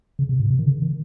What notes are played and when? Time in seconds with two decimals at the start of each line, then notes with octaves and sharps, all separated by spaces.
0.19 C#3
0.29 C3
0.40 A2
0.50 C3
0.59 D#3
0.66 C#3
0.82 D#3